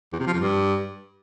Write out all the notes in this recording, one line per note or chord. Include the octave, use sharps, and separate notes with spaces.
E2
C3
F3
F2
G2